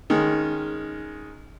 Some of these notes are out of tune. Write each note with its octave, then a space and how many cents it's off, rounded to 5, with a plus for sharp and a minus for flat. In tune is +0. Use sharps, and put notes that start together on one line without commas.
D#3 +0 G#3 +0 C#4 +0